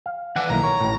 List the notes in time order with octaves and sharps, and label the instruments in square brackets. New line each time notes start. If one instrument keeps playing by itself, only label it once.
[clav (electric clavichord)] F5
[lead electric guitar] E3 [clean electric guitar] A4 D5 F#5
[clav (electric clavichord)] B1 A#3 E4 [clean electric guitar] D#3 [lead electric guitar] A#5
[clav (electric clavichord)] A#4 [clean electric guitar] C#5
[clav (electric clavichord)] A1 A2